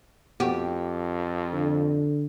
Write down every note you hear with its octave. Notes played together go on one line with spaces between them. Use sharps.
F2 B3 F#4 G4
D3